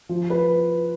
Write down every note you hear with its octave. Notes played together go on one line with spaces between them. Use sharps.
F3
B4